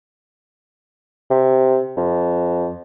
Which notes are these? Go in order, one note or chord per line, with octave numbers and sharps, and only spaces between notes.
C3
F2